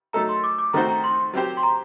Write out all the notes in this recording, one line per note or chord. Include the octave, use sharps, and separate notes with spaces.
F#3 A3 D#4 A4 A#5
C6
D6
D6
D#3 A3 C4 F#4 C5 A#5
A#5
C6
F#3 C4 G4 C5
C6
A#5